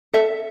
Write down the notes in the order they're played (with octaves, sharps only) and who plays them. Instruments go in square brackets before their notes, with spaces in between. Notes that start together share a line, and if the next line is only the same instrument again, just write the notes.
[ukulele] A4 E5